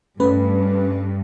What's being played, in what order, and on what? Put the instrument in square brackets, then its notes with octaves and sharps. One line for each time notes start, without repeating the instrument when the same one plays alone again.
[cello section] G2 [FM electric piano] A3 C#4 B4